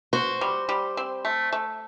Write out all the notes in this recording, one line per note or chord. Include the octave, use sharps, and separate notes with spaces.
F#4 C5
G3
G3
C4
A3
A3